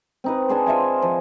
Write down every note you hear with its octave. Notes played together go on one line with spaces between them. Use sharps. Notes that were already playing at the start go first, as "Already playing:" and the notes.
C4 D#4 B4
D4 G#4 C5
F4 D#5 E5 G#5
F3